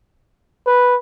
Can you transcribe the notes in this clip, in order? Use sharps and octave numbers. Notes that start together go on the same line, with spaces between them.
B4